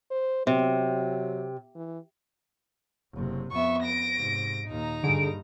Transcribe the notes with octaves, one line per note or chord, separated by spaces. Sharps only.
C5
C3 F#3
E3
F#1 C3
F2 B3 E5 C#6
A#6 D7
G#2 C3
D#2 A#2 D#4 A#5
G2 D3 G#4 D7